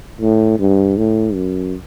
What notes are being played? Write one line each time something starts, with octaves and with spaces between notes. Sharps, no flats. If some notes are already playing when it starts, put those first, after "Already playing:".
A2
G2
A2
F#2